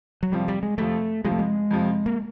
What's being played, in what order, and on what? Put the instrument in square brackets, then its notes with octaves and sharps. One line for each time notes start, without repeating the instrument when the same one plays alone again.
[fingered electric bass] F#3
[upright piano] F2 C3 F3 [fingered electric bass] G3
[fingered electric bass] G3
G#3
[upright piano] F2 C3 F3 [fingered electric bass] A3
[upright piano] F2 C3 F3 [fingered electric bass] G#3
[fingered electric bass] A3
G#3
[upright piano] F2 C3 F3
[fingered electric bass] A#3